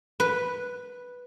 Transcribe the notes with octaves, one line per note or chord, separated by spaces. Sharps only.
B4